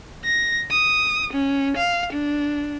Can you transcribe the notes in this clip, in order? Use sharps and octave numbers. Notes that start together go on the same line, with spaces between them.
A#6
D#6
C#4
F5
D4